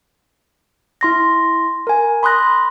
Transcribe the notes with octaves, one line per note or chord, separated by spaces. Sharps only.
E4 C6 A#6
A#4 G#5
B5 C6 D#6 F#6 A#6